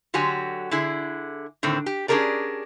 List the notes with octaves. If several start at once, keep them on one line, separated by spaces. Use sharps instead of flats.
D3 F#3 F#4 G4 G#5
D3 E4 G#4
A2 D3 D#3 C4
G4
C#4 D4 G4 G#4 A#4 D5